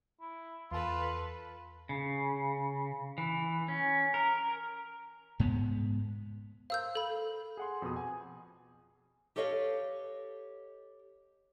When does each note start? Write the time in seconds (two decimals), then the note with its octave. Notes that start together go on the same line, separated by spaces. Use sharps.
0.21 E4
0.71 E2 F4 A4 B4 A5
1.89 C#3
3.18 E3
3.68 C#4
4.14 A#4
5.40 G#2 G#3 B3
6.70 A#4 C5 F5 E6 G6
6.95 A4 B5
7.57 G#4 F#5 C6
7.82 F2 B2 D#6
7.96 G#5
9.36 G4 A4 B4 C#5 D#5 F5